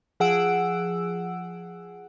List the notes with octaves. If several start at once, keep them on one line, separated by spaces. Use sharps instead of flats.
F3 G#4 F#5 E6 D7